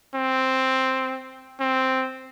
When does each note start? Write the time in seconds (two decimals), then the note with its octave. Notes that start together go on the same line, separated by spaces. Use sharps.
0.15 C4
1.60 C4